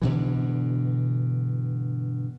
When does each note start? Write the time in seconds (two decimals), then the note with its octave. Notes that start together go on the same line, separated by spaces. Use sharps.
0.02 G2 B2 D3 E3